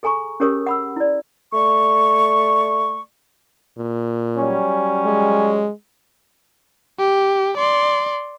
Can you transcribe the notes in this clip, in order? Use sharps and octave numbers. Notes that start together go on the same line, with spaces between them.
G#4 A4 G#5 A#5 C#6
C#4 G4 G#4 A#4 C#5 D#6
F#5 B5 E6
E4 D5
A3 D5 C#6
A#2
F#3 G3 C#4
G#3
G4
D5 C6